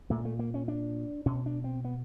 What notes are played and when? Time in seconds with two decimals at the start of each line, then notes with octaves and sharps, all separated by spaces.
0.10 A#2 A3
0.25 A3
0.39 A#3
0.54 C#4
0.68 D4
1.26 B2 C#4
1.46 D4
1.64 C4
1.84 B3